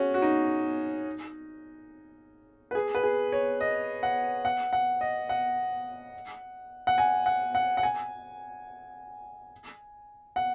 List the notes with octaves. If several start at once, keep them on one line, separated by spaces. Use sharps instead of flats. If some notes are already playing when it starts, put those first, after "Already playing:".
Already playing: C#4 F#4 G#4
F#4
D#4
B4
G#4
B4
G#4
C#5
D#5
F#5
F#5
F#5
D#5
F#5
F#5
G#5
F#5
F#5
F#5
G#5
F#5